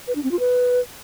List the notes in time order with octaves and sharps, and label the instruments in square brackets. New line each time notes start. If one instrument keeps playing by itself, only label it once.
[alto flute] B4
D4
C4
F4
B4